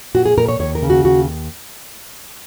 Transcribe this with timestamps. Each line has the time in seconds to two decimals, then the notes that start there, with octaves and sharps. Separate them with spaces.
0.14 A#2 F#4
0.26 G#4
0.37 A#2 A#4
0.48 C#5
0.59 D#2 C#5
0.75 A#4
0.83 C#3
0.90 F#4
1.05 D#2 F#4